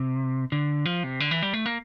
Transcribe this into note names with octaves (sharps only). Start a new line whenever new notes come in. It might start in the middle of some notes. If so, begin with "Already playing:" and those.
Already playing: C3
D3
F3
C3
D3
E3
G3
A3
A#3